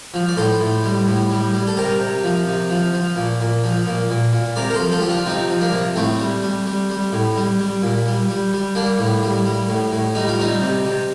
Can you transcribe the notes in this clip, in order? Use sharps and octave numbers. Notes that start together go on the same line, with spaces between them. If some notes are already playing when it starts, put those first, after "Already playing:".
F3
D5
A2 A4 C5
A2
G3
A2
G3
G3
A4
C3 G4 A#4
C3
F3
C3
F3
F3
A#2
A#2
F3
A#2
A#2
A#2
C3 A#4 D5
A#4
A4 C5
F3
F4 A4
F3 G4
D4 F4
C3 C4 D#4
F3
A#3 D4
C3
A2 A3 C4
G3
G3
G3
G3
A2
G3
G3
A#2
G3
G3
G3
G3 A#3 D4
A2
G3
G3
A2
A2
G3 D#4
F4
G3 C4 D#4
C3
C3